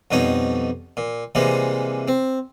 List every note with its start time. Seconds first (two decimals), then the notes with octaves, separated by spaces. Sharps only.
0.11 F2 B2 G3 D#4 C#5
0.97 A#2
1.35 C3 E3 G3 G#3 A#3
2.08 C4